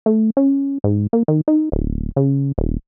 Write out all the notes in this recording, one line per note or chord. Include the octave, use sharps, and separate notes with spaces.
A3
C#4
G#2
A#3
D#3
D#4
D1
C#3
D#1